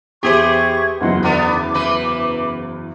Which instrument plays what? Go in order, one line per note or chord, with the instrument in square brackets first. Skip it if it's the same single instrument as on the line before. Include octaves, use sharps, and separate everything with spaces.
[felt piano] E2 [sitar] G4 G#4 C5 [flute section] E5 C#6 G#6
[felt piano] F#1 E2 F#3 [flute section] D#5 F#5 C6
[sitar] D3 B3 [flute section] D6
[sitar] E3 B4